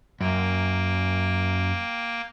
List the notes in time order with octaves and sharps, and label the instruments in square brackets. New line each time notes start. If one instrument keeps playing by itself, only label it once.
[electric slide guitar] F#2 [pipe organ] A#3 G5